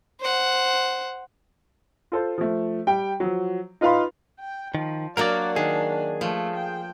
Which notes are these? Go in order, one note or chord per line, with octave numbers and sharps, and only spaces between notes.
C5 F#5
F4 A4 C5
F3 A3
G3 G5
F3 F#3
D#4 F4 B4 F5 B5 C6
G5
D#3 F3
F#3 A#3 D4 F#4 A#4 D5
D#3 G#4
F3 A3
G5